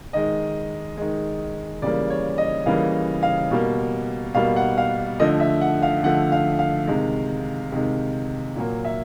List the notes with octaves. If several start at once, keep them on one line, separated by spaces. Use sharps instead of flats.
D#3 G#3 D#5
D#3 G#3
C#3 E3 G3 A#3 D5
C#5
D#5
C#3 E3 G3 A#3 F5
F5
B2 G3 A#3
B2 G3 A#3 F5
F#5
F5
D3 F3 A3 D#5
E5
F#5
F5
D3 F3 A3 F#5
F5
F5
C3 D#3 G#3
C3 D#3 G#3
A#2 F#3 A#3
E5